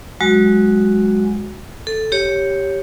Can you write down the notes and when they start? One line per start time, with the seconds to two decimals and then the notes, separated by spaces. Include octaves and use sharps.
0.21 F#3 G#3 F#4
1.87 A4
2.12 G4 C#5